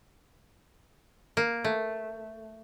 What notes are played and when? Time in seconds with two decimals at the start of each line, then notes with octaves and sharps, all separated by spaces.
1.37 A#3
1.65 A3